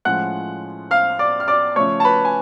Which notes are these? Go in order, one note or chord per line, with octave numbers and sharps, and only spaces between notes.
A2 F3 G#3 C#4 F4 F#5 F#6
F5 F6
D5 D6
F6
D5 D6
C#3 F3 A3 C#5 C#6
A5
B4 B5
G#5